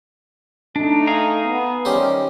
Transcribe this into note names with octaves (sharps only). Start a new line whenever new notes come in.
A3 D4 D#4
G#4 F5 A#5
B3
D#3 G3 C#4 G4 C5